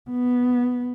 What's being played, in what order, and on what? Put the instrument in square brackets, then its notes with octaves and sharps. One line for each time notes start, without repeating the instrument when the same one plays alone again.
[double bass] B3